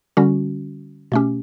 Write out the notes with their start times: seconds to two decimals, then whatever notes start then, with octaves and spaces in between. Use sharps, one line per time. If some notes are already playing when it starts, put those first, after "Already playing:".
0.17 D3 G3 C#4 F#4
1.12 B2 A3 C#4 G4